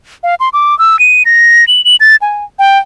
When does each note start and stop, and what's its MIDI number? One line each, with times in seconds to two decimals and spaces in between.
0.23 0.35 77
0.40 0.49 84
0.53 0.77 86
0.79 0.99 88
0.99 1.23 99
1.26 1.65 94
1.68 1.84 102
1.85 1.96 102
2.00 2.16 93
2.22 2.44 80
2.59 2.78 79